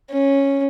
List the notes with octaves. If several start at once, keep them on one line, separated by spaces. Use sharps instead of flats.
C#4